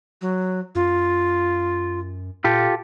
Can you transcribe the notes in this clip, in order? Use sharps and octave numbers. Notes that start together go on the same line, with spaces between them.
F#3
F#2 F4
A#2 F4 G4 A4